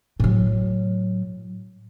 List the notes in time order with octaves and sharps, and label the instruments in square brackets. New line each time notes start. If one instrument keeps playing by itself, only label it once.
[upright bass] A2 F#3